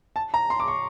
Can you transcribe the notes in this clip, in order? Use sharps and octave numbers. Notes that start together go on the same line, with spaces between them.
A5
A#5
C6
D6
C#6